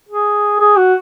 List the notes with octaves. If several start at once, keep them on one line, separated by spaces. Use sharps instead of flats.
G#4
G#4
F#4